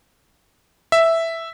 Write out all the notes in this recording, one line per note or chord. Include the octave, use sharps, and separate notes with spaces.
E5